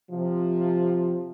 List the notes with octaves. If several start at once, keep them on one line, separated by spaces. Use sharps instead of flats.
C3 F3